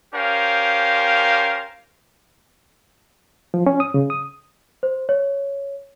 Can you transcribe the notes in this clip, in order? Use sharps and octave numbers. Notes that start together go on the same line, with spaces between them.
C#4 G4 A#4 C5 F5
F3
C#4
D#6
C#3
D#6
C5
C#5